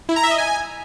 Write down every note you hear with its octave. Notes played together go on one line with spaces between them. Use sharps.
E4
A#5
E5
D#5
G#5